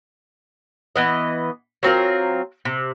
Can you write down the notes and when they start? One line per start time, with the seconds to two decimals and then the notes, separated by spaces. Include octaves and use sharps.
0.96 E3 B3 D#5
1.83 F#3 C4 F4 A#4
2.65 C3